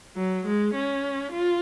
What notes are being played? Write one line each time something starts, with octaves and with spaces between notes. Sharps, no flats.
F#3
G#3
C#4
F4